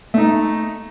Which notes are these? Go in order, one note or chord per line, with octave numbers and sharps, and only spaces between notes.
A3 D#4